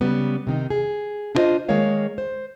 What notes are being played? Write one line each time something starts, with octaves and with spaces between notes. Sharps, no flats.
C#3 F#3 G3 B3
C3 D#3 D#4
G#4
D4 E4 F4 C5 D#5
D#3 G#3 A#3 A#4 C#5 F5
C5